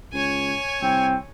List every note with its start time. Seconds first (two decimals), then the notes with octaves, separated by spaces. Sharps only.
0.13 C#2 C#5 G#5
0.82 C2 C4